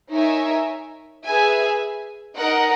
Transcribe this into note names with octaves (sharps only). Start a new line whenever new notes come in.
D#4 A#4 C#5 E5 G#5
G#4 B4 E5 G#5
D#4 A#4 D#5 F#5